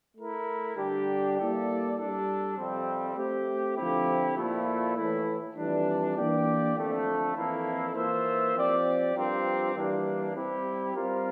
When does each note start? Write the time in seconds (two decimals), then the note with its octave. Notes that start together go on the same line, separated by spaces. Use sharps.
0.17 A3 E4 A#4
0.77 D3 G3 D4 G4
1.37 G3 A#3 E4 A4 D5
1.98 G3 D4 A4
2.57 F2 C3 G3 C4
3.17 A3 C4 G4
3.77 D3 F3 C4 E4 G4
4.36 A#2 F3 A3 E4
4.96 A2 E3 A3 E4
5.56 F2 E3 G3 D4
6.16 E3 A#3 D4 G4 D5
6.76 F2 D3 A3
7.35 F2 E3 A#3 E4 A4
7.95 E3 A#3 F4 C5 E5
8.55 F3 C4 G4 D5
9.15 G2 F3 C4 G4 A#4
9.75 E3 G3 A#3 D4
10.35 G3 C4 E4 G4
10.95 G3 C4 F4 A#4